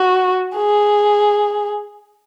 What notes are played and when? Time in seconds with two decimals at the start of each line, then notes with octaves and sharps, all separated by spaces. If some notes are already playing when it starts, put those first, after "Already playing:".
Already playing: F#4
0.56 G#4